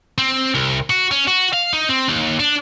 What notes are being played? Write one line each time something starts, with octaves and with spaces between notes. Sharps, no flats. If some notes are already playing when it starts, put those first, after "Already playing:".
C4
C2
F#4
C#4
F#4
F5
D#4
C4
D#2
D4